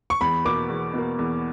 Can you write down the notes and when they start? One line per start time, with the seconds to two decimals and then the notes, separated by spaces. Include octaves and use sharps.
0.10 C#6
0.21 E2 B5
0.45 B2 A#3 D6
0.69 E2
0.93 B2 A#3
1.19 E2